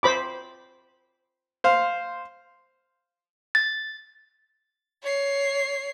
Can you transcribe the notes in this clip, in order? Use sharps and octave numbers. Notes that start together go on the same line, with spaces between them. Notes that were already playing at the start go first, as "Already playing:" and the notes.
C5 B5 D6
C5 F5
A6
C#5 C7